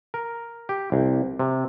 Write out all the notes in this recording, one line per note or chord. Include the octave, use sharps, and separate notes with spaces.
A#4
G4
C2
C3